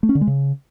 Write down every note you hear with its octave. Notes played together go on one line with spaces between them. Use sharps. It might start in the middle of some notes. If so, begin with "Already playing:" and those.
A3
C#4
D3
G#3
C#3